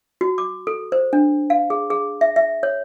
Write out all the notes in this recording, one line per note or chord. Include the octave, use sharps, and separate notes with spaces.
F#4
D6
A4
C5
D4
F5
G#4
G#4
E5
E5
C#5